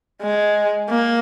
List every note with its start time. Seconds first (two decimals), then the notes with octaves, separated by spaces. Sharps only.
0.22 G#3
0.89 A#3